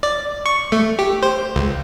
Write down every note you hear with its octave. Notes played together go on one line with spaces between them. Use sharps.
D5
C#6
A3
G4
C5
C#2